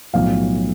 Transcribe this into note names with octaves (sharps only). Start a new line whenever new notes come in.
B1 A2 F3 F5